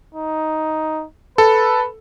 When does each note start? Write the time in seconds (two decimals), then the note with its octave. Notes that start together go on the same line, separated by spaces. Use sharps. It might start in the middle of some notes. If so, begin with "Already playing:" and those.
0.15 D#4
1.38 A4 B4